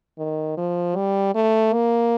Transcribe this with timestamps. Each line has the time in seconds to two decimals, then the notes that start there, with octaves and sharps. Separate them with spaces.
0.18 D#3
0.58 F3
0.96 G3
1.35 A3
1.73 A#3